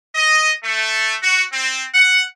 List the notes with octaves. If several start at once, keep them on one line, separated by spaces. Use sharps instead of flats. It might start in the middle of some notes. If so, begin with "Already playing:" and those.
D#5
A3
F#4
C4
F#5